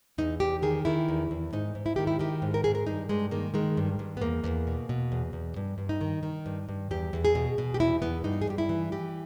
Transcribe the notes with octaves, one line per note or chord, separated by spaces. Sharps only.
E2 D#4
E2 G4
D#3 G#4
D#3 E4
E2
E2
G#2 D#4
G#2
E4
D#3 G4
E4
D#3 G4
G#2
A#4
G#2 G#4
A#4
G2 D#4
G2 G#3
D#3 A#3
D#3 G#3
G2
G2
B3
E2 A#3
E2
B2
B2
E2
E2
G2
G2
D#4
D#3
D#3
G2
G2
E2 G4
E2
G#4
B2
B2
G4
E2 E4
E2 B3
G2 D#4
G#4
G2 G4
E4
E3
E3 G4